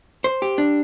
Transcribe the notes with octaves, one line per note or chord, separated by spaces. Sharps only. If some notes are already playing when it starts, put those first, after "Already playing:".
C5
G4
D4